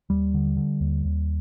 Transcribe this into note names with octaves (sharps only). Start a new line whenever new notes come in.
D#2 G3
D3
D3
D#2
D#2